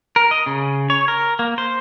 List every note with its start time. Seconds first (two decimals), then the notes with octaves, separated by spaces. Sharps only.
0.16 A#4
0.31 D#5
0.46 C#3
0.90 C#5
1.08 A#4
1.39 A#3
1.58 C5